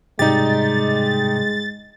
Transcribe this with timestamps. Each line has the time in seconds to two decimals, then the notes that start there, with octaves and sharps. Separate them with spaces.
0.19 G#2 C3 G3 G#3 D#4 G4 A6